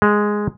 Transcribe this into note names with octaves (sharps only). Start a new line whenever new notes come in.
G#3